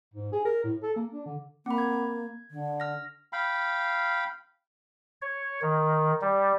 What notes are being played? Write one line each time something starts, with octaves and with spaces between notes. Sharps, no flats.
G#2
G#4
A#4
A2
A4
A#3
D4
D3
A#3 C4 B5
G#6
D3
F6 A#6
F5 G5 B5
C#5
D#3
G3